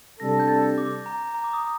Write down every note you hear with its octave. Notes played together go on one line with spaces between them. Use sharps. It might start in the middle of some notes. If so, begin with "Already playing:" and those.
C3 G3 D4 A4 A#6
G6
A6
D6
A#5
A#5
D6
D#6